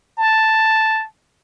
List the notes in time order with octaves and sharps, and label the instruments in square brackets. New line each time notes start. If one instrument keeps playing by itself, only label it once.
[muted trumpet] A5